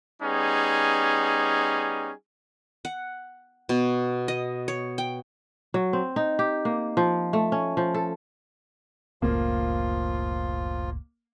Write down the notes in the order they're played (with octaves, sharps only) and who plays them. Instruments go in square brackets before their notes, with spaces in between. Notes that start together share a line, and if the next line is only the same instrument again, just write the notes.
[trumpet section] G3 B3 C#4 D#4 G#4
[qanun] F#5
B2
D#5
C#5
G5
[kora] F#3
C4
D#4
G4
A#3
F3
A3
C#4
F3
A4
[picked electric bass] F#1 C#2 A2 [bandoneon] F3 F4 [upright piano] A#3